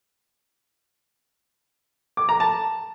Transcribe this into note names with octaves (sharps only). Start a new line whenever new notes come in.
D6
A#5
A5